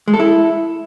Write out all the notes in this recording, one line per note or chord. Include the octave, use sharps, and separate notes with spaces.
G#3
A4
E4